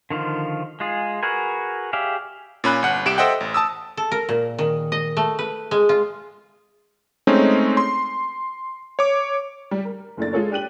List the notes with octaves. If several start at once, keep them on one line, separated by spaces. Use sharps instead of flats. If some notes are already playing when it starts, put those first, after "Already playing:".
D3 D#3 F3 F4
G#3 F4 G#4
F#4 G#4 A#4 B4 G#5
G4 G#4 D5 E5 F5
A#2 C#4 B5 F#6
G1 F#5 F#6
C2 G4 D7 E7
A4 C5 D#5 E5 F#5 G5
A1
A5 D#6 E6
A4
A#4
A#2
D#3
D#5
A3
B4
G#3
F4
G#3 A3 C4 C#4 D#4
C6
C#5 D6
G3
A#4
F#1 A2 A3 A#3 D4 A6
G#3 F4 A4 C#5
D4 G4 F#6 D#7 F#7